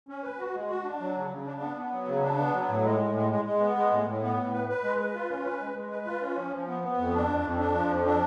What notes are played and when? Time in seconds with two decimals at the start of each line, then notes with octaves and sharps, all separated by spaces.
0.09 C#4
0.24 B4
0.38 F#4
0.54 G#3
0.69 F#4
0.84 D4
1.00 F#3
1.16 C#3
1.30 C#3
1.46 D4
1.61 B3
1.77 B3
1.92 F#3
2.07 C#3
2.23 D4
2.38 B3
2.53 F#3
2.69 A2
2.84 G#3
3.00 A2
3.15 G#3
3.31 G#3
3.45 G#3
3.60 B3
3.76 G#3
3.91 A2
4.07 A2
4.22 B3
4.37 A2
4.53 B4
4.69 B4
4.84 G#3
4.99 B4
5.15 F4
5.30 C#4
5.44 B4
5.60 G#3
5.76 G#3
5.91 B4
6.06 F4
6.22 C#4
6.37 F3
6.52 F3
6.67 B3
6.83 B3
6.98 F2
7.14 D4
7.30 F2
7.44 F2
7.60 D4
7.75 F3
7.91 F2
8.06 D4